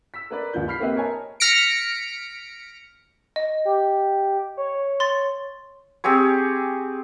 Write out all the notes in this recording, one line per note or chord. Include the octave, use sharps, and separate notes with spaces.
E6 B6
A#4 B4 D5
D#2 C#3 F3 G6
B5 F6 B6 C7
A#3 C4 G4 B4 E5
A#4 C#5 D#5 G#5 A5
F6 A#6 B6 C#7 D7
D#5
G4
C#5
C6 A6
C4 G4 G#4 C#5